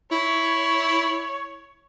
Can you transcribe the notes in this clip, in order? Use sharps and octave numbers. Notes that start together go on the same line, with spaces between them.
E4 C#5